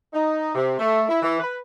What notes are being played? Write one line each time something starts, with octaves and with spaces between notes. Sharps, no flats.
D#4
C3
A3
E4
E3
B4